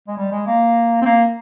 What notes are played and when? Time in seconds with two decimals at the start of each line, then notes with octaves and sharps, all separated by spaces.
0.08 G#3
0.17 G3
0.32 G#3
0.46 A#3
1.02 C4
1.05 A#3